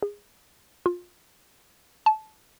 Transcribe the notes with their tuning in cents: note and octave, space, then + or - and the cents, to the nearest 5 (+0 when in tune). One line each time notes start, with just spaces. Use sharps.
G#4 -20
F4 +25
A5 -20